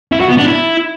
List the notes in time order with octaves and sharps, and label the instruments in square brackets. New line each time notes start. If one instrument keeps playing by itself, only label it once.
[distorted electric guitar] E4
F#4
B3
D4
E4